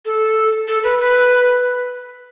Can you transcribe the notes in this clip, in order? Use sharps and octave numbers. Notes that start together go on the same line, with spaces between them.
A4
A4
B4
B4